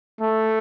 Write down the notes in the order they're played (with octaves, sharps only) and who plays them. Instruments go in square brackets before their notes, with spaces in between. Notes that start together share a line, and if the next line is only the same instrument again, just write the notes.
[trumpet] A3